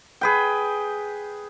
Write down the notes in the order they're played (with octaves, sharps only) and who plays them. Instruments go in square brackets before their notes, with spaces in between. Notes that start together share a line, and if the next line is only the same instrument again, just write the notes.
[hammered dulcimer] G#4 B4 G5